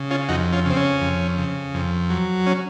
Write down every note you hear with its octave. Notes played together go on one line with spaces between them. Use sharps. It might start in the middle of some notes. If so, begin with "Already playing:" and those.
Already playing: C#3
C#4 F4
F2 D#4 F#4
C#4 F4
C#3 C4
C#4
F2
C#3
F2
F#3
C#4